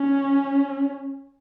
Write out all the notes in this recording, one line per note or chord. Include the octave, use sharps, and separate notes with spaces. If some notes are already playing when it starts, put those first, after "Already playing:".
Already playing: C#4